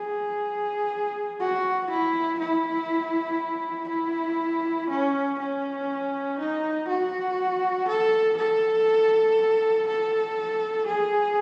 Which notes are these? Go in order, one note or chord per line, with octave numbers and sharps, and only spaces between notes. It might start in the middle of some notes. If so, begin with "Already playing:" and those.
Already playing: G#4
F#4
E4
E4
E4
C#4
C#4
D#4
F#4
A4
A4
A4
G#4